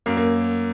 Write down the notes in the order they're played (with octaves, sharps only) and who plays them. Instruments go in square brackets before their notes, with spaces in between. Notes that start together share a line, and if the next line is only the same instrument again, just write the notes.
[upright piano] F#2 A#3
A#3